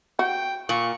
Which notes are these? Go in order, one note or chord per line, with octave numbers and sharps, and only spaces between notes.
F#4 G5
A#2 C#6